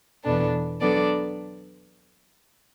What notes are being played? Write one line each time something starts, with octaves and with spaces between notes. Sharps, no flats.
E2 B2 B3 D4 A4
F#3 B3 D4 A4 D5